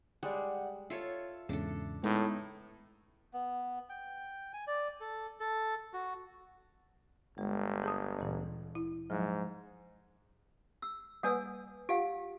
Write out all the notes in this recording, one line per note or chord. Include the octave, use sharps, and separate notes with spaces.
G3 G#3 D5 F#5
F4 A4 C#5 E5
E2 G#2 C#3 D4 A4
A2 G#3 B3 D#4
B3
G5
G#5
D5
A4
A4
F#4
G1 G#3
G#4 A5 D#6
D2 A#2 E3
E4
G#2 F3 F#3
E6
G3 A#3 B4 F#5 G#5 E6
F4 G4 F5 F#5